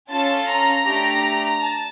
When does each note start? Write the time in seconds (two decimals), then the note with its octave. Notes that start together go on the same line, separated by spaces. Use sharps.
0.11 C#4 F4 A4 A5
0.49 A#5
0.86 A3 D4 G4
1.61 A5